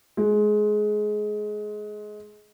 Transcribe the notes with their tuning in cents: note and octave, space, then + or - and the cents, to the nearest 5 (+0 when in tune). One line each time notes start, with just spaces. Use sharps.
G#3 +20